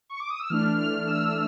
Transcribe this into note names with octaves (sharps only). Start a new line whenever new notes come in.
C#6
D6
D#6
E6
E3 A3 D4 F6
F6
E6